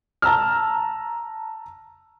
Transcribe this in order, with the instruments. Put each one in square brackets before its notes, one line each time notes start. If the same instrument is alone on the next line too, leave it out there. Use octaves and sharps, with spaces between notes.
[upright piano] A5 A#5 E6 F6